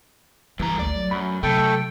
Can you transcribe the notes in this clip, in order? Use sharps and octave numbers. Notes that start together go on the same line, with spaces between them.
G2 E3 A#5
G#1 D2 A3 D5
F#3
F#2 B5
C3 F#3 A3 A4 G5